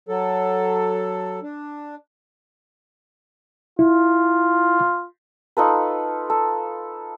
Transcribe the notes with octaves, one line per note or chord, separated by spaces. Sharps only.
F#3 A4
D4
E4 F4
D#4 F4 A4 B4
A4